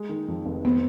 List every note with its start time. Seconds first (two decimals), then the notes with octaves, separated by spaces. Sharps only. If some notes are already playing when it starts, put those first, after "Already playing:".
Already playing: G#3
0.09 D#3
0.28 F2
0.46 F1
0.65 B3 C4